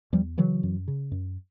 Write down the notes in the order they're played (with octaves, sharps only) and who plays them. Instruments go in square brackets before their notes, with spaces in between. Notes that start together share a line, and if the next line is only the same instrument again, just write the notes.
[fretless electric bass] E2 F3 G3
C#3 E3 F#3
F#2
C#3
F#2